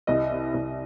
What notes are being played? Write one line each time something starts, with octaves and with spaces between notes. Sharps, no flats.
C2 D#5
C3
C2